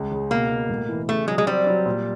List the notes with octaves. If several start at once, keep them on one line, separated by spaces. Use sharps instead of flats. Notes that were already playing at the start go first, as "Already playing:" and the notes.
Already playing: C#2
C#3
B2 A#3
B2
A2
E3
C#3 A3
F#3 G#3
G#3
G3 C4
F#3
A#2